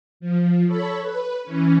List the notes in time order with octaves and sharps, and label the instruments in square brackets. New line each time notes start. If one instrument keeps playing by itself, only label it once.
[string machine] F3
A4 C#5 B5
B4
E3 C#4